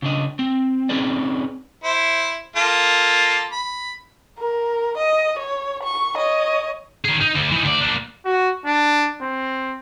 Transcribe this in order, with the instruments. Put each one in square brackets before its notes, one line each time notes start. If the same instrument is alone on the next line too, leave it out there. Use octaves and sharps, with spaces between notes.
[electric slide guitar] C#3 D4 D#5
C4
C4 C#4 D#4 G#4 B4 D5
[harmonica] E4 C5
A#3 F4 A4
B5
[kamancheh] A#4
D#5
C#5
C#6
C#5 D#5
[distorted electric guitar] D#3 G#4
D#4
D2
E3 D#4
D2 D5
A#3 D4
[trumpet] F#4
D4
C4